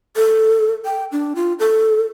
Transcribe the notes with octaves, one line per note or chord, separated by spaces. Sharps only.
A4
G5
D4
F4
A4